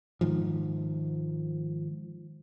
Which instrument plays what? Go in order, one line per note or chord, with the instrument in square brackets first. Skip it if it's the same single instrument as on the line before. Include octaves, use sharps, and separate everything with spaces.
[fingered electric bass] G#2 D#3 F3